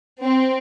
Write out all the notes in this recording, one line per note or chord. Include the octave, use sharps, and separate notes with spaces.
C4